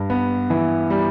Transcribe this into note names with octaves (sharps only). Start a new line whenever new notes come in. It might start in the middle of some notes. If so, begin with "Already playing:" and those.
Already playing: G2
B3
E3
G3